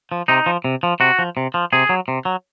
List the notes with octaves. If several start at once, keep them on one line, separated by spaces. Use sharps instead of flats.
F3
C3 D#4
F3
C3
F3
C3 F#4
F3
C3
F3
C3 G#4
F#3
C3
F#3